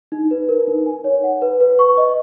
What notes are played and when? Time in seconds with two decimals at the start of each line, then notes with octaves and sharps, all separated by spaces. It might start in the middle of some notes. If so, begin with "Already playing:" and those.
0.12 D#4
0.31 B4
0.49 A#4
0.68 D#4
0.86 G#5
1.04 C#5
1.24 F#5
1.42 B4
1.61 B4
1.79 C#6
1.98 D#5